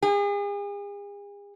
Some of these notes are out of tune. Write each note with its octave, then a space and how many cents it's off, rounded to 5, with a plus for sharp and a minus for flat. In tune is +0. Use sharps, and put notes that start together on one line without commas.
G#4 -40